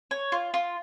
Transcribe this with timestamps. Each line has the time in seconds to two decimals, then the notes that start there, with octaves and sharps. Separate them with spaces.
0.11 C#5
0.32 F4
0.54 F4